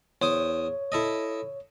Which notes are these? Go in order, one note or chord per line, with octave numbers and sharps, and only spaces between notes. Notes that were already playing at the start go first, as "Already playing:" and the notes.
E2 C5 C#5 D#6
E4 A4 D#5